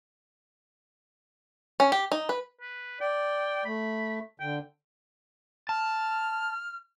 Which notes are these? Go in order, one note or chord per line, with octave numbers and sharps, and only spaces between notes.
C#4
G4
D#4
B4
B4
D5 G5
A3 B5
D3 G5
A5 F6